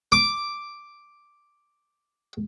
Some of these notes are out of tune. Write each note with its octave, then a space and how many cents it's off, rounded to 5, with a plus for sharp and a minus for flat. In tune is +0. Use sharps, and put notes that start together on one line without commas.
D6 +0